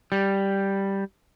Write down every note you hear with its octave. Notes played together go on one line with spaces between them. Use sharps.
G3